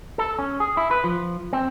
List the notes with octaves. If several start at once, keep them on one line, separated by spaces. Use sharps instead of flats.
A4
C#4
G#4
E4
B4
F3
C4